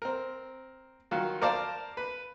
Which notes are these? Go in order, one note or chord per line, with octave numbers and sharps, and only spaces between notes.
C4 A#4
D#3 F#3 F4
A#4 C5 D5 F5 A5
B4